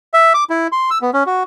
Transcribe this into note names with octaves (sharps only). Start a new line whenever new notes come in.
E5
D6
E4
C6
E6
B3
C#4
F#4